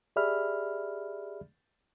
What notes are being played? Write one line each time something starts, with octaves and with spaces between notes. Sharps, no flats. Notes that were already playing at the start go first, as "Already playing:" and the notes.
G4 G#4 D5 E5 B5 F6